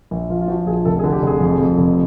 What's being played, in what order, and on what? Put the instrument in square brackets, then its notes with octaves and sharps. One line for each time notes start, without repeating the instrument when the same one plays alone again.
[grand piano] A#1
F3 F4
F4
F3 F#4
A#1 G#4
F1 A4
G#4
D3
G4
F1 G#4
F2
F2
F1